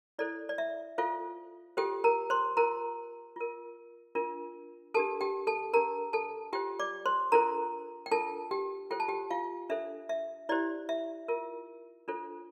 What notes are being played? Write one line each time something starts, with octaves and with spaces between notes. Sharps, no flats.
E4 A4 C5 D5
D5
E5
F4 A4 C5 F5
F4 G4 A4 C5 G5
A#4 A#5
C5 C6
F4 A#4 C5 A#5
F4 A#4
D4 F4 A#4
D4 G4 A4 A#4 A5
G4 G5
A4 A5
D4 G4 A#4 A#5
A4 A5
F4 G4 C5 G5
D5 D6
C5 C6
D4 F4 A4 A#4 C5 A#5
G5
D4 F4 A4 A#4 A5
G4 G5
F4 A4 C5 G5
A5
G4 G5
F4 F5
D4 A4 C5 E5
E5
E4 G4 C5 D5
E5
F4 A#4
D4 F4 A4 C5